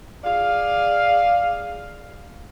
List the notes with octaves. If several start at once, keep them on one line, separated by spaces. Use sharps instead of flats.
G#4 D5 F5